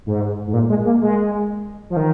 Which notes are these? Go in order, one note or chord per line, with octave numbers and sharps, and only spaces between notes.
G#2
G#2
A#2
G#3
A#3
G#3
F3
D#3